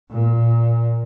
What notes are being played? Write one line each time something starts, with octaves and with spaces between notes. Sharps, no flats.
A#2